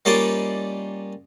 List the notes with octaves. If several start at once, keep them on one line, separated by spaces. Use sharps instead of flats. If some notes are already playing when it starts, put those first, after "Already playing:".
G3 A#3 C#4 D#4 F4 D5